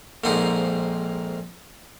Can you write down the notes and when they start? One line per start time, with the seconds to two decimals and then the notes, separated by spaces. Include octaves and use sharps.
0.24 A#1 F2 G#2 A#3 C4 D#4